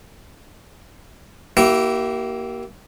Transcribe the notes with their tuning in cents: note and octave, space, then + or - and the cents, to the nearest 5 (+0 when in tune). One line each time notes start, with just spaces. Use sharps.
A#3 +10 E4 +0 G4 -35